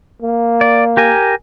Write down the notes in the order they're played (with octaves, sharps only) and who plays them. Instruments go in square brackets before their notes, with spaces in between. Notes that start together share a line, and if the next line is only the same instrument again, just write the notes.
[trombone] A#3
[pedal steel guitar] D5
G4 A#4 G#5